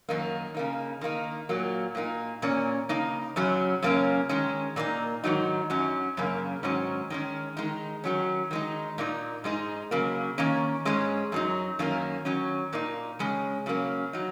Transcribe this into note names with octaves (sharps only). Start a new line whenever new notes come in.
F#2 D#3 A#3 D#4
C#3 A#3 D#4
D#3 A#3 D#4
A#2 F#3 A#3
A#2 A#3 D#4
A#2 A#3 C#4
C#3 A#3 D#4
F#2 C#3 F#3 C#4
F#2 C#3 A#3 C#4
D#3 G#3 C#4
A#2 A#3 D#4
G#2 D#3 F#3 D#4
F#2 F#3 C#4
F#2 C#3 A#3
G#2 D#3 F#3 C#4
D#3 G#3 C#4
D#3 G#3 D#4
D#3 F#3 C#4
D#3 G#3 D#4
A#2 A#3 D#4
G#2 G#3 D#4
C#3 F#3 A#3
D#3 A#3 C#4
G#2 G#3 C#4
F#2 F#3 D#4
F#2 D#3 A#3 C#4
D#3 F#3 C#4
A#2 A#3 D#4
C#3 G#3 C#4
C#3 F#3 A#3 C#4
F#3 D#4